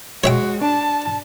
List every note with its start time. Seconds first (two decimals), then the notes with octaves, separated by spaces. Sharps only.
0.24 G#3 F#4 C#5 E5 G5
0.62 D4 A5